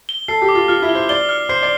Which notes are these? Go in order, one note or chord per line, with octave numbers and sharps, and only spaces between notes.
G7
A4 C7
G4
D6
F4
F4 F6
E4
G7
C5
D5 G7
F6
C5 C7
D5